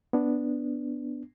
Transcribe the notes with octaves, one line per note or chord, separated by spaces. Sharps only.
B3 D4